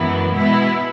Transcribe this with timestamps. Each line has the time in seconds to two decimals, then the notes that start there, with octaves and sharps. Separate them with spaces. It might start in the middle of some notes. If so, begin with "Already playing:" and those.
Already playing: F#2 E3 G#3 B3 E4
0.35 B2 G#3 B3 E4 E5